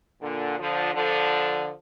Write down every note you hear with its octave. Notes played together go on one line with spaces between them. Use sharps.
A#2 D3
D3 F3
D3 F3